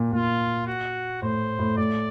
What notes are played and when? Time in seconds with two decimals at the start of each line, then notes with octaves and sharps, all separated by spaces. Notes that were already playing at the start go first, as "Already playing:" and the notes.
Already playing: A#2
0.12 A#2 F4
0.67 F#4
1.22 A2 C5
1.59 A2
1.77 A2 D5